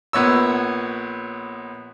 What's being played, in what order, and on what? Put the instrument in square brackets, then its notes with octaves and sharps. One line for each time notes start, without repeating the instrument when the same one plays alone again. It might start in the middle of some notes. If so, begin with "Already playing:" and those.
[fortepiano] A#1 B3 C#5 E6